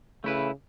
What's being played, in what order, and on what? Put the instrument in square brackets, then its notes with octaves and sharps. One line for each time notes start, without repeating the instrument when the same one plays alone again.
[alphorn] C#3 [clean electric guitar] A3 E4 B4